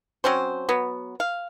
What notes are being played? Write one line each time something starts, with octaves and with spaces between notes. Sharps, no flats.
F#3 C4 C#4 C5
F#3 B3
F5